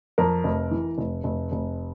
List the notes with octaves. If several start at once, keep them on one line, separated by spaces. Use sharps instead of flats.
F2 A#4
F1
E3
F1
F1
F1